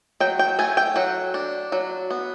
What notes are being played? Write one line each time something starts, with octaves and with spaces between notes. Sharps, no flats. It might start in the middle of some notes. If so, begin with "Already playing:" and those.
F#3 G5
G5
A3 G#5
G5
F#3 F#5
D4
F#3
B3